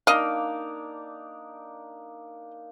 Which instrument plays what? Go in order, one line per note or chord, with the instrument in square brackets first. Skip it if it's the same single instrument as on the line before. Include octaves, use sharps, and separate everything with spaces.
[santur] A#3 D4 D#4 [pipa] D#5 F5